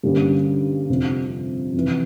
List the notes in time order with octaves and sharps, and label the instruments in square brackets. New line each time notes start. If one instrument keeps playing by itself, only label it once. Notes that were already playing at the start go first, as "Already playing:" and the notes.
[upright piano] G2 D3 G3 A#3 C#4
F2 C3 F3
F2 C3 E3